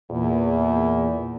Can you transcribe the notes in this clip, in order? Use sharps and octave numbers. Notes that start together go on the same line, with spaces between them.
E2 A#2